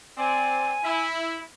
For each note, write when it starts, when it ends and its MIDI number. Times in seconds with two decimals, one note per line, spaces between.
0.17 0.76 60
0.17 0.76 74
0.17 1.05 80
0.83 1.40 64